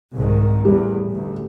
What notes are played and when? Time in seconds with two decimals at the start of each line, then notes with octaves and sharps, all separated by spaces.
0.15 C2 G#2 D#3
0.65 A1 E2 G3
1.10 A1 D2